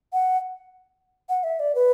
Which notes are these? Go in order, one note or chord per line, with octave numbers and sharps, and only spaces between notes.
F#5
F#5
E5
D5
B4